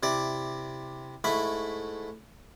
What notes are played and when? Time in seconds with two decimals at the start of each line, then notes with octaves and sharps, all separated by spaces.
0.03 C3 E4 D5
1.24 G#2 A3 E4 B5 C#6